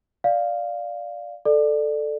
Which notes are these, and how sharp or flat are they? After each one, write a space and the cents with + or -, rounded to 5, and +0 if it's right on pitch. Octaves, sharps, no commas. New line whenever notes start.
D5 +0 F5 +0
A4 +0 D5 +20